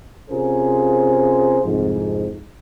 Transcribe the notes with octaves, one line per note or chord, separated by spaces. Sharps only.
C3 C#4 F4 G#4 A#4 C5
C2 F2 G#2